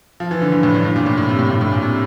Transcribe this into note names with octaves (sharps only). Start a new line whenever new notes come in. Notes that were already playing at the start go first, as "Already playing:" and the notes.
F3
E3
D3
G2
A2
G2
G2
A#2
A2
A2
C3
A2
G2
A2
A#2
C3